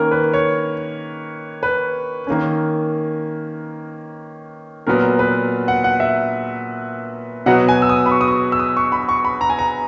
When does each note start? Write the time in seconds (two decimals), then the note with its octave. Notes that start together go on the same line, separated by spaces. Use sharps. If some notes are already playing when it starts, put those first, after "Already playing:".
Already playing: D#3 A#3 C#4 A#4
0.11 B4
0.34 C#5
1.63 B4
2.27 D#3 A#3 C#4
4.87 A#2 F#3 B3 A#4
5.19 B4
5.68 F#5
5.84 F#5
6.00 E5
7.46 B2 F#3 B3 F#5
7.68 G#5
7.82 E6
7.89 D#6
8.06 B5
8.11 C#6
8.21 D#6
8.28 C#6
8.52 E6
8.59 D#6
8.77 C#6
8.92 B5
9.09 C#6
9.25 B5
9.41 A#5
9.50 G#5
9.59 A#5